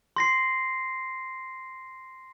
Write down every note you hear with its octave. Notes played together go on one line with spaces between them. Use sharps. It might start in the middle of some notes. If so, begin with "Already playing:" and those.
C6 A#6 C7